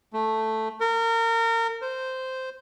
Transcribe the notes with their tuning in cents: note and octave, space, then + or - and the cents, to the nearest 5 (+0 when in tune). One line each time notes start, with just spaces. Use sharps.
A3 +0
A#4 -30
C5 -10